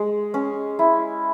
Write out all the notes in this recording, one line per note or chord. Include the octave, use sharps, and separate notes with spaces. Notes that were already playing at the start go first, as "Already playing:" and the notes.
Already playing: G#3
C#4
E4